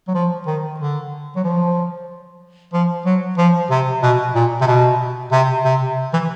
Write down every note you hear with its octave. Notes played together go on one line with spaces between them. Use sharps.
F#3
F3
D#3
D3
F#3
F3
F3
F#3
F3
C3
B2
A#2
C3
B2
C3
C3
E3